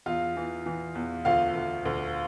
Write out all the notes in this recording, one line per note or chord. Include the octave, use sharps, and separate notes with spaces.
E2 F4 F5
E3
E3
E2
D2 F4 F5
D2
D2